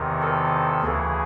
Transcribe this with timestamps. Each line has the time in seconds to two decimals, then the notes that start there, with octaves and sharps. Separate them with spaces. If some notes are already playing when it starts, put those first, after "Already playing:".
Already playing: E2 C3 D#3 A#4
0.22 A4
0.83 D2 C#3 E3 G#4